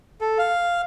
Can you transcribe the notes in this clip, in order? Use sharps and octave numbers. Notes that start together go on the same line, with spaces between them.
A4
F5